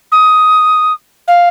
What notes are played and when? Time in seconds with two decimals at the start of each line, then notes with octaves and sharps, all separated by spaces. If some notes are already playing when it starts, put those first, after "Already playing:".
0.12 D#6
1.28 F5